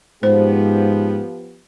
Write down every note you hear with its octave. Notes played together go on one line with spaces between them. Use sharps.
G#2 F3 B3 G4 C5